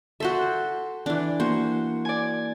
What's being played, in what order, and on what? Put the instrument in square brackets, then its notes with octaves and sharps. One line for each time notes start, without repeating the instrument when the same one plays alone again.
[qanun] F#4 C5 E5 [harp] A4
[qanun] E3 D4
[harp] A#3 F#4 [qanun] C5
[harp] D5 G#5